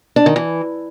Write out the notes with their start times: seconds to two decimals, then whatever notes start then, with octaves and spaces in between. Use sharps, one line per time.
0.16 D4
0.26 D#3
0.36 E3